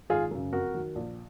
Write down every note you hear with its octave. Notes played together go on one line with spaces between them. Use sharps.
G#1 F4 G#4
F#2 C#3
F2 F#4 A#4
D#3 F#3
A#1